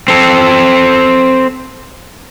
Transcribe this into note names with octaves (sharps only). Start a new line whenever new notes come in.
C4 A4